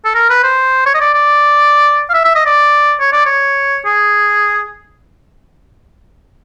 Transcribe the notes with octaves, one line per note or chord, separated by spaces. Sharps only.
A4
A#4
B4
C5
C#5
D#5
D5
D5
F5
E5
E5
D#5
D5
C#5
D5
C#5
G#4